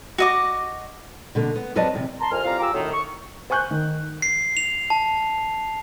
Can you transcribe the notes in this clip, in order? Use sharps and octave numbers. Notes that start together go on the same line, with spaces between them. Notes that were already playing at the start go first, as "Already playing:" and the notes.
F#4 D#5 D6
B2 D3 A#3
B3
F2 F#3 B4 D5 D#5 A5
E2 C3
A5 A#5 C6
F2 C3 A#4 G#5 F6
A2 G3 C4 F4 F5 A#5
F4 G4 G#5 A#5 D6 E6
F#2 A2 D#3
C#6
C5 G#5 C#6 F#6 G6
D#3
C7
F7
A5